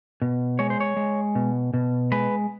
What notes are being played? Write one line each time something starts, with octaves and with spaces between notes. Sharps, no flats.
B2
G#3 C#5
C5
C#5
G#3
B2
B2
G#3 B4